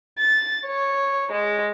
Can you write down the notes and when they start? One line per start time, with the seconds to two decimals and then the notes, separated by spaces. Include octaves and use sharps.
0.19 A6
0.67 C#5
1.31 G#3